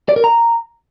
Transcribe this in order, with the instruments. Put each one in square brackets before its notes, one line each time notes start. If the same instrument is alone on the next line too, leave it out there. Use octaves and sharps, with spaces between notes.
[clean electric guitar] D5
A#4
A#5